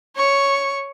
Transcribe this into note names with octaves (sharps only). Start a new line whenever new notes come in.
C#5 C#6